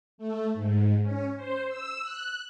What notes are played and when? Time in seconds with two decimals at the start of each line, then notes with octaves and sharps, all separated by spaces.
0.18 A3
0.54 G#2
1.03 C#4
1.37 C5
1.68 E6
2.02 F#6